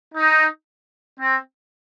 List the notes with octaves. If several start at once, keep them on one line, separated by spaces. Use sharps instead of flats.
D#4
C4